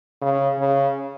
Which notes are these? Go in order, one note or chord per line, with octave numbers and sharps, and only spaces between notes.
C#3
C#3